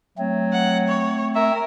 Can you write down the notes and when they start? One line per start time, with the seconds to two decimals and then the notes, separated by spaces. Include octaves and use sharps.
0.18 F#3 A3 C4
0.53 F#5
0.88 C#5
1.35 A#4 E5